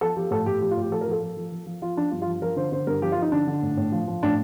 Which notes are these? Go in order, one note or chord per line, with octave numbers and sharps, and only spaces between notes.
F3 A4
F3 G4
A2 A4
A2 G4
F3 G4
F4
A2
G4
F3 A4
A#4
F3 A4
F3
F3
F3
F3
F3 F4
F3 D4
G2 F4
F4
F3
F3 A#4
D3 C5
D3 C5
G2 A#4
F3 G4
F4
F3 D#4
D3 D4
D3
A2
A2
F3
F3
A2 D4